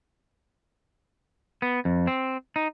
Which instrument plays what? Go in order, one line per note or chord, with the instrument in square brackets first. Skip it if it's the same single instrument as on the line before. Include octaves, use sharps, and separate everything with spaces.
[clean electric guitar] B3
F2
C4
D#4